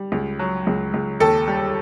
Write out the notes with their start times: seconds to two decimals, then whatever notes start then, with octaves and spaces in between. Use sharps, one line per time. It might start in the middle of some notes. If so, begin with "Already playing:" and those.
Already playing: G3
0.12 C#2
0.39 F#3
0.67 C#2
0.94 C#2
1.20 D#2 A4
1.48 G3